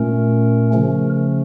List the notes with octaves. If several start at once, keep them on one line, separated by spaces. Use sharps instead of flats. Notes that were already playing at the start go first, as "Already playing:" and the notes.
Already playing: A#2 A3 C#4 A#4
C#3 F3 A3 C#4